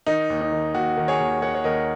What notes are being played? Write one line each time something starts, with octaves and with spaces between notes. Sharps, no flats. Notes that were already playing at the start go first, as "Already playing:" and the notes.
D#3 D#4
D#2
D#4
D#3
D#2 F#4
D#3
G#4 C#5
D#2
D#3 C#5 F#5
C#5
D#2 A#4 D#5